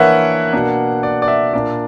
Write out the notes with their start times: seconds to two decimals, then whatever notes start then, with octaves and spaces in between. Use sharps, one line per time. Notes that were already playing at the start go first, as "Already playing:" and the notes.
Already playing: E3 A#3 D4 A#4 B4 C#5 E5 F#5
0.53 B2 A#3 D4
1.03 D5
1.22 D5
1.28 E5
1.53 A#2 A#3 D4 D5